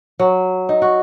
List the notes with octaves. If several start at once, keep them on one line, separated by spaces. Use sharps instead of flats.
F#3
D#4
F#4